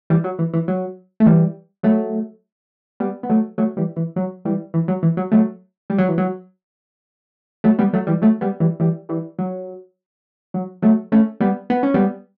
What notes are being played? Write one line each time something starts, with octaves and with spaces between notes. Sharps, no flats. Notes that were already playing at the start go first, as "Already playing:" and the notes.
E3 G3
F#3
E3
E3
F#3
A3
E3 G3
F#3 A3
G3 B3
B3
F#3 A3
F#3 A3
E3 G3
E3
F#3
E3 G3
E3
F#3
E3
F#3
F#3 A3
G3
F#3
E3
F#3
F#3 A3
G3 B3
F#3 A3
E3 G3
F#3 A3
G3 B3
E3 G3
E3 G3
E3 G3
F#3
F#3
F#3 A3
A3 C#4
G3 B3
B3
C#4
G3 B3